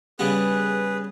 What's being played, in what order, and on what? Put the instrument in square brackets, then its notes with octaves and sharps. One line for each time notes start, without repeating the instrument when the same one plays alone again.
[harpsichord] C#3 G3 B3 [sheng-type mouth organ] G#4 B4